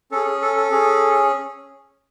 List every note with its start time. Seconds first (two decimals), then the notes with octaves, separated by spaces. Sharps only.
0.11 C#4 G#4 A4
0.26 G#4
0.42 A4
0.56 A4
0.72 C#4 G#4